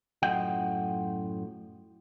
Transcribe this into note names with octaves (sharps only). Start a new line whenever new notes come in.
F#2 A2 F4 D#5 F#5 G5